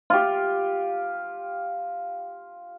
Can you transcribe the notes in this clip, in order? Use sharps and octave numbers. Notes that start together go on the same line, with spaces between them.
F4 G4